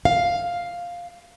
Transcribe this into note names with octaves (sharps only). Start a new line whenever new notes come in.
F5